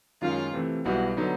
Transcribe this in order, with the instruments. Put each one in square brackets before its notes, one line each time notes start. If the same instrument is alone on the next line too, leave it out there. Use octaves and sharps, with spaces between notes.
[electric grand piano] F#2 D#3 G#3 C#4 [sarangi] F4
[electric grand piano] C3 E3 A3 C4
[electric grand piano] B1 B2 G3 B3 E4 [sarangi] F#4
[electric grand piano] D3 F#3 B3 D#4